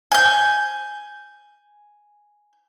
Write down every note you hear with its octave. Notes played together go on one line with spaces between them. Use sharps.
G#5 G6